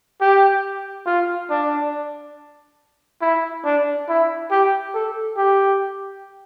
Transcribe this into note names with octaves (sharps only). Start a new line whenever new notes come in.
G4
F4
D4
E4
D4
E4
G4
A4
G4